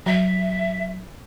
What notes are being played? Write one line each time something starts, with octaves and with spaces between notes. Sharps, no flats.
F#3 E5